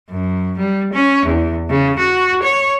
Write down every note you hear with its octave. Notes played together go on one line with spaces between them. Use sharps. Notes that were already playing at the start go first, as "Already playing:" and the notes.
F#2
G3
C#4
E2
C#3
F#4
C#5